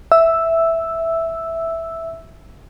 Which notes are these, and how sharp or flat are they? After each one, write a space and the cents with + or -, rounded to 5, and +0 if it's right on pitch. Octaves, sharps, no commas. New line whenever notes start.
E5 +0 E6 +0